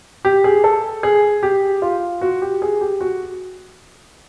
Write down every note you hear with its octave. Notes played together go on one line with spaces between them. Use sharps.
G4
G#4
A4
G#4
G4
F4
F#4
G4
G#4
G4
F#4